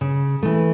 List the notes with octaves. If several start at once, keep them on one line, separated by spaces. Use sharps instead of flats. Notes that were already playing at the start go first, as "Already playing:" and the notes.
C#3
E3 A3